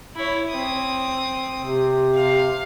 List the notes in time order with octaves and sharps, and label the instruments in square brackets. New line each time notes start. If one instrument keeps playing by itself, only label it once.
[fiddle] E4 C#5
C4 D#6
[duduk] C3
[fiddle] F5